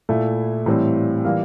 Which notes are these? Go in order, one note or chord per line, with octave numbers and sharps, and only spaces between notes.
A#2 A3 E4
A2 E3 G3 C4
E3 G3 A#3 F4 A#4